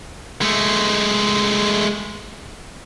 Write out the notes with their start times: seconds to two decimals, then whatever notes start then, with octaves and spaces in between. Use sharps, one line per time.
0.42 G#3 A3